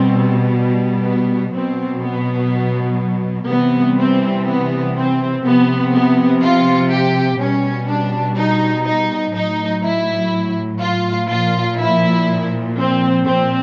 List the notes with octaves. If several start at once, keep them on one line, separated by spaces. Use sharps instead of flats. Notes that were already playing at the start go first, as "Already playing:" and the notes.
Already playing: B2 G3 C4
B3
B2 F#3 C4
B3
C3 E3 G3 B3
C4
B3
C4
C3 F3 B3
B3
F4
G4
B2 G3 C#4
D4
D#4
D#4
A2 F#3 D#4
E4
F4
A#2 F3 F4
E4
C4
A#2 F3 C4